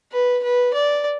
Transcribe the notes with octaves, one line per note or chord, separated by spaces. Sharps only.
B4
B4
D5